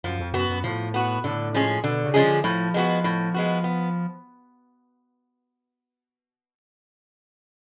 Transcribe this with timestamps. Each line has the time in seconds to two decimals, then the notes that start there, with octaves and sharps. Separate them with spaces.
0.04 F#2 F3
0.19 F2
0.33 F#2 B3 F#4
0.50 F#2
0.64 A2 F3
0.94 B3 F#4
1.24 A2 D3
1.54 F3 G#3 C#4 G#4
1.84 B2 D3
2.04 C#3
2.14 F3 G#3 C#4 G#4
2.24 D3
2.44 A2 F3
2.74 G#3 B3 F#4
3.04 A2
3.34 G#3 B3 F#4
3.64 B3